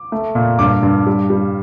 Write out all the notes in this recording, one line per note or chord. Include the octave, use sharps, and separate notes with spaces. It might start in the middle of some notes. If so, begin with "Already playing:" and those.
Already playing: D6
A3
A#2
G2 D6
G2
G3
G3